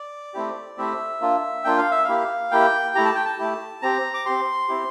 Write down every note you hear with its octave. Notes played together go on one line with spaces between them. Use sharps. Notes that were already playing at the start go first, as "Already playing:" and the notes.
Already playing: D5
A3 C4 E4 G4
A3 C4 E4 G4 E5
A#3 D4 F4
A#3 D4 F4 G5
F5
E5
A#3 E4 G4 F5
A#3 E4 G4 G5
A3 E4 G4 A#5
A5
G5
A5
A3 E4 G4
C4 G4 A#5
D6
C4 G4 C6
C4 E4 G4